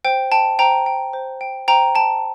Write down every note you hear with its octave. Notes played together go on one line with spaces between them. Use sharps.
C5 G5
G5 A5
C5 G5 A#5
G5
C5
G5
C5 G5 A#5
G5 A5